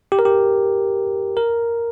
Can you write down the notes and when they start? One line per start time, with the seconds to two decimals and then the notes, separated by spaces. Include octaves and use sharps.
0.12 G4
0.19 A#4
0.25 G4
1.37 A#4